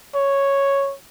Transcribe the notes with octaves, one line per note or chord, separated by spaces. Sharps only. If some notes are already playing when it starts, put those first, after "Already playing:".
C#5